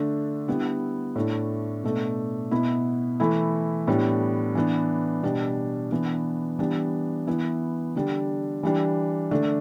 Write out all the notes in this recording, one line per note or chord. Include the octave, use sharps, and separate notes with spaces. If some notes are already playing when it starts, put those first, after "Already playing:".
Already playing: D3 A3 D4
D3 G3 B3 E4
A2 A3 D4
B2 A3 D4
B2 B3 E4
E3 A3 E4
A2 G3 B3 D4
E3 B3 D4
B2 G3 D4
E3 B3 D4
E3 G3 B3 D4
E3 B3 E4
D3 G3 D4
E3 G3 D4
D3 A3 D4